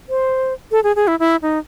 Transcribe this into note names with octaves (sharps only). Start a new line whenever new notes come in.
C5
A4
G#4
G#4
E4
E4
D#4